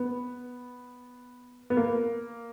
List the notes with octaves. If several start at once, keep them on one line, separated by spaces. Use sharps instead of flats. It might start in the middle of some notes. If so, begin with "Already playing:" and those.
Already playing: B3
B3
A#3